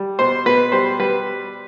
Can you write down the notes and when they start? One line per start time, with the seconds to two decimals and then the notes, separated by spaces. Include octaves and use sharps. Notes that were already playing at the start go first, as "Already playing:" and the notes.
Already playing: G3
0.19 B2 C5
0.46 B2 B4
0.72 G3 C5
0.99 G3 B4